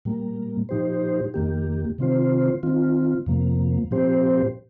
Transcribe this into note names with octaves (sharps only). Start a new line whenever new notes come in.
A#2 G3 A#3
A#2 F3 D#4 G4 C5
F2 D#3 A#3 G4
C3 D#3 C4 F4 C5
D#3 C4 F4
F2 C3 F3 A#3
A#2 F3 C4 G4 C5